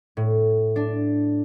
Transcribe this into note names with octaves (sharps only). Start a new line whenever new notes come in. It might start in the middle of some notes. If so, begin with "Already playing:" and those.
A2
D4